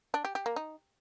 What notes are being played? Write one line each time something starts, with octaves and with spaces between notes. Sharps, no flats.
D4
G4
G4
A#3
D#4